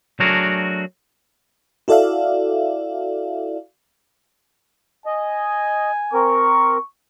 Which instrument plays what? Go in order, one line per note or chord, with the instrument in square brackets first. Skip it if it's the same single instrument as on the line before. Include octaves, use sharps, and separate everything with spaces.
[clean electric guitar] F#3 A3 D4 F#4 G#4 A#4
[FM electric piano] E4 F#4 A4 D5 E5 F5
[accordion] D#5 [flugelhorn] G#5
[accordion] C4 A#4 [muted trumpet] C#6